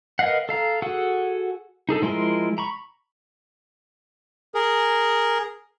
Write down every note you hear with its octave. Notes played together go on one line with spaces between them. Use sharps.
A#4 B4 D#5 F5 F#5
A4 F5 A#5
F#4 G#4 A4 F#5
D#4 G#4 A4
F3 G#3 E4 A#4 C6
A#5 B5 C#6
G#4 A#4